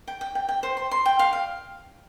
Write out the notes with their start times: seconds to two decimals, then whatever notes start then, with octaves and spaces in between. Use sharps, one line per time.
0.07 G5
0.21 G5
0.35 G5
0.49 G5
0.63 C5
0.77 C6
0.91 C6
1.06 G5
1.19 F5
1.33 F5